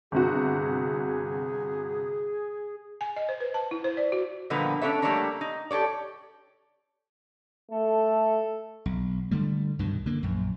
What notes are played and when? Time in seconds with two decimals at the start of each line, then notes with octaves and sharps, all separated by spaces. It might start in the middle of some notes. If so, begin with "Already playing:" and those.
0.12 G1 C3 F#4 G#4
3.01 G#5
3.17 D#5
3.29 C5
3.40 B4
3.54 A5
3.71 E4
3.84 C5
3.97 D5
4.12 F#4
4.50 A#2 D3 F3 G3 A#3 B3
4.82 C#4 D4 A4 C#5 E5
5.02 G3 A3 A#3 D4 C#5 A#5
5.41 D#4
5.71 G4 A4 C#5 D5
7.72 A3 A4
8.86 B1
9.31 D3 G3 A3
9.79 C2 G2 B2 D#3
10.06 D3 A#3
10.23 A#1 F#2